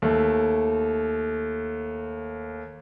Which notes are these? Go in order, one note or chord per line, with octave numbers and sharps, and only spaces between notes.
D#2 A3